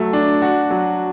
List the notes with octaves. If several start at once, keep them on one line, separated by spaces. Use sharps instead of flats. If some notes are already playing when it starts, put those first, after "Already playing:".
Already playing: F#3 A3
D4
F#4
F#3